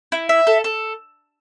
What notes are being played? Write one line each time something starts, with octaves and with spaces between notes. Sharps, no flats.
E4
E5
A4
A4